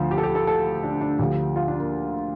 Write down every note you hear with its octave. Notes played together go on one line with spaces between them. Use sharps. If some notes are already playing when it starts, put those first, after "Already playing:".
Already playing: D2 D3 F3
G4
A4
G4
A4
A4
D4
D4
D2 D3 F3 G4
F4
D4
A#3